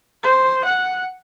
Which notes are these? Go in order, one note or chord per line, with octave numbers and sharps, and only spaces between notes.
C5
F#5